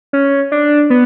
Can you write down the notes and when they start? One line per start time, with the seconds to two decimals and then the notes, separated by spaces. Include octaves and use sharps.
0.13 C#4
0.52 D4
0.90 B3